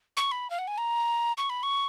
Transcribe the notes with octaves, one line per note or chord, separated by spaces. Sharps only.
C#6
B5
F5
F#5
G#5
A#5
C#6
B5
C#6